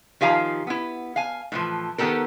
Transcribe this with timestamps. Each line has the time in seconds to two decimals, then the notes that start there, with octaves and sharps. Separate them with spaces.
0.21 D#3 F3 G4 F5 G#5 A#5
0.67 B3 E4
1.16 F5 G#5
1.52 A2 E3 F3
1.98 D#3 B3 C#4 G4 A4 A#4